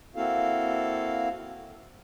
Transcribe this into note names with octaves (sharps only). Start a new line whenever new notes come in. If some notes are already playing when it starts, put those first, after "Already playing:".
A#3 C4 E4 F#4 A4 F5